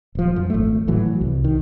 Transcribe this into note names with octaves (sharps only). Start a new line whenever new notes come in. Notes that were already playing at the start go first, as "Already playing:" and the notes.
D#1 F3
F#2
G#1 A3
A2 E3 F#3
C2
D#3